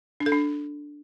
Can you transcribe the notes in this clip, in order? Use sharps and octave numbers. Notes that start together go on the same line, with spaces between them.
D4
A4
D4